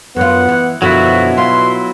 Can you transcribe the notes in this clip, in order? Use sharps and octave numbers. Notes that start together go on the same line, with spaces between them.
F#2 B3 F4 F#5
E3
F#2 B2 D3 F3 F#3 B3 E4 F#4
F4 C6